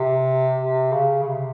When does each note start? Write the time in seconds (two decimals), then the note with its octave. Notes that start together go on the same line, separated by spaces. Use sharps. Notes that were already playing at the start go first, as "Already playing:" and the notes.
Already playing: C3
0.58 C3
0.92 C#3
1.23 C#3
1.27 C3